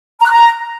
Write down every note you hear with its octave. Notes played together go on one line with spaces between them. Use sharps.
A#5
F#6
A#5